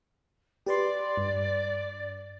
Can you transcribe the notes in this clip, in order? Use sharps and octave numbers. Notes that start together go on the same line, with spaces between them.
G4 B4 D5 C6
G2